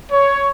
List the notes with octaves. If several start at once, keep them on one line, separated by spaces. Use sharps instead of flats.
C#5